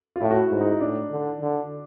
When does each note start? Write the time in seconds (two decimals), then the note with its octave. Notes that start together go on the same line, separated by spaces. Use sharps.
0.16 F4
0.20 A2 E4
0.30 F#4
0.50 G#2
0.61 D#4
0.71 D#4
0.80 A2 D4
1.11 D3
1.41 D3